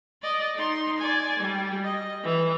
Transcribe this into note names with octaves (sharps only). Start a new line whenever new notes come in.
D5 D#5
D#4 C6
D5 G#5
G3
D#5
E3